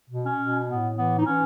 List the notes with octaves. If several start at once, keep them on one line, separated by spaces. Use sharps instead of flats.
B2
C#4
B2
A2 B3
E3 B3
D#4
E3 C#4